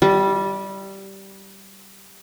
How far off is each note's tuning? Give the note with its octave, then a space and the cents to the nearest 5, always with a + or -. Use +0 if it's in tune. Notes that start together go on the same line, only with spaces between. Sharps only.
G3 -10 D#5 +45